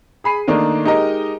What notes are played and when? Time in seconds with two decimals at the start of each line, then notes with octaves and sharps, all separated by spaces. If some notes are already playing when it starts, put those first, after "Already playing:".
0.24 G#4 B5 C7 D#7
0.48 D#3 A3 A#3 D4 D#4
0.84 G#3 D#4 G4 A#4 D#5